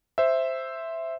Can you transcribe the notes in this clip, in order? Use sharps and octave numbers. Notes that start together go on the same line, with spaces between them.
C5 E5